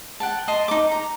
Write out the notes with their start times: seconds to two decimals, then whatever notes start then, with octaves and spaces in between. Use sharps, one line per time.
0.20 F#5 G5 A5
0.48 D#5 A5 C6
0.68 D#4 D6
0.91 A#5